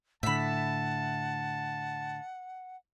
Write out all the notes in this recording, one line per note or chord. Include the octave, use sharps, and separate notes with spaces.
A2 D3 E5 F#5 A5 B5